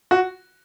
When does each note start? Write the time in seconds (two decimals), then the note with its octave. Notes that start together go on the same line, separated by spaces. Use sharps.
0.11 F#4